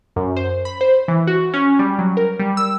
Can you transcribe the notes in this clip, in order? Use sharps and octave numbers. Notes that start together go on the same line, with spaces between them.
F#2
C5
B5
C5
E3
F#4
C#4
G3
F#3
A#4
G3
E6